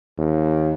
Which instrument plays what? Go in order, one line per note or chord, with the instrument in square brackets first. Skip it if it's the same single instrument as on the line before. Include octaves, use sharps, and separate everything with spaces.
[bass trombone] D#2